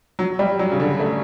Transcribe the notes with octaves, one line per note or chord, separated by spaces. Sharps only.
F#3
G3
F#3
C#3
D3
A3